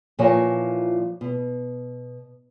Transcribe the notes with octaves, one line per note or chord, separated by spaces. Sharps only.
A#2 E3 F3 A#4 C#5 G#5
B2